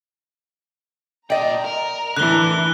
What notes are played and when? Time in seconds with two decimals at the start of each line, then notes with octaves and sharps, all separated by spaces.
1.30 A#2 D5 D#5 G5 A#5
1.65 A#4
2.16 A2 D3 E3 F#6 G7